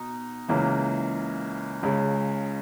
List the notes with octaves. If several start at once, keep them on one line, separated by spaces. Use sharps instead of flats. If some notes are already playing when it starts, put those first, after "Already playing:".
Already playing: B2 D#4
C#2 C#3 E3 A#3
C#2 C#3 G#3